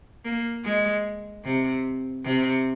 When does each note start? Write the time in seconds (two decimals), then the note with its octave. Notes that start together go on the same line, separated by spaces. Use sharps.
0.25 A#3
0.64 G#3
1.45 C3
2.25 C3